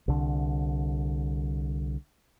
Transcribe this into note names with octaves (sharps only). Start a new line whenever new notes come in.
C2 D3